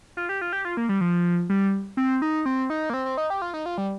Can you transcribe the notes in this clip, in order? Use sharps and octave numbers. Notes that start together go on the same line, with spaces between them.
F4
G4
F4
G4
F4
A#3
G3
F3
G3
C4
D#4
C4
D#4
A#3
C4
C4
D#4
G4
F4
D#4
F4
G3